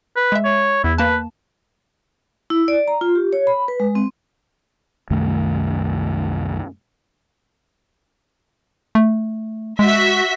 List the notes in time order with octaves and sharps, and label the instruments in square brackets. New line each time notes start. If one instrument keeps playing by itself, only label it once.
[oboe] B4
[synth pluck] G#3 E5
[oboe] C#5
[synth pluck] E2 [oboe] E4
[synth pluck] A#3 A5 [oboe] B4
[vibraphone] E4
D5
A#5
F4
G4
C#5
B5
B4
G#3
C4
[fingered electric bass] C2 F#2 D#3 A3
[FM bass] A3
[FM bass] G#3 [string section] F#4 E5 B6